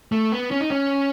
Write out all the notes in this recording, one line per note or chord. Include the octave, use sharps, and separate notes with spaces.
A3
B3
C#4
D#4
C#4